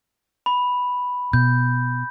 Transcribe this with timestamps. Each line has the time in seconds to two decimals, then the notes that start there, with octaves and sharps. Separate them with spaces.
0.46 B5
1.33 B2 G6